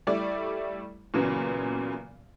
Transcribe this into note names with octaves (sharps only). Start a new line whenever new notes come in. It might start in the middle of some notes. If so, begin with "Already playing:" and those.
G3 A3 E4 D5
A#2 C#3 E3 F#3 B3